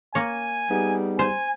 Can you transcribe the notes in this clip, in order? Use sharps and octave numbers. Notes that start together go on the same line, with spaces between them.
A#3 C#5 G#5
G3 B3 D#4 G#4
C5 G#5